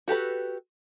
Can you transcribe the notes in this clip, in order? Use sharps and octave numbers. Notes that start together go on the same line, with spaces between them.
F#4 G4 A4 B4